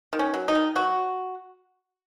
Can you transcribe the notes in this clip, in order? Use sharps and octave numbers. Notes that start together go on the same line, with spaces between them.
D#3
C#4
F#3
D#4
D#3
F#3 F#4